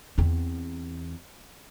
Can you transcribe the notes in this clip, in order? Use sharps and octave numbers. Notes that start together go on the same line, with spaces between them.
E2 C4